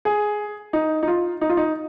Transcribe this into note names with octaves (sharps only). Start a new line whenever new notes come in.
G#4
D#4
D#4
F4
D#4
F4
D#4